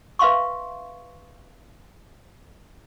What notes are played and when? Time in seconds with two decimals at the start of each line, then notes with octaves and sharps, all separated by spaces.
0.19 B4 E5 F5 C6 C#6